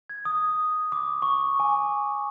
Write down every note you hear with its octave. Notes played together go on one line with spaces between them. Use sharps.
G#6
D#6
D6
C#6
G#5